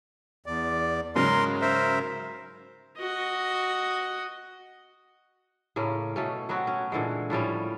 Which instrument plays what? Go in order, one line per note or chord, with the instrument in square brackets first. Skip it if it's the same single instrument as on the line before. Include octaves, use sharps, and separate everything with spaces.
[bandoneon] E2 D5
[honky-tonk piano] G#2 C#3 F#3 [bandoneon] A#4 C6
[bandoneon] A#4 C5 E5
[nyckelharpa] F#4 D#5
[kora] A2 C#3 A#3 C#4
B2 A3 C#4
F#3 B3 C4 F#4
C#4
A#2 D3 E3 G#3
A2 F3 G3 C#4